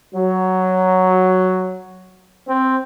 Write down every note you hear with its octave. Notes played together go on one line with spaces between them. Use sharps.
F#3
C4